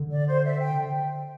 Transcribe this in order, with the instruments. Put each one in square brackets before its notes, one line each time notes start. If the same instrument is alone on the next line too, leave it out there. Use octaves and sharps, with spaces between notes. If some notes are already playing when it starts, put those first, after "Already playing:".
Already playing: [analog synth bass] D3
[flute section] D5
C5
E5
G5